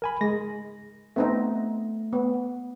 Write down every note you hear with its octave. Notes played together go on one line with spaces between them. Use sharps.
A#4 G#5 B5
G#3 A#6
A3 B3 C4 D#4
B3